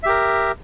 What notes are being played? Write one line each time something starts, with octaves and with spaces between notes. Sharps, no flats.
G4 A#4 E5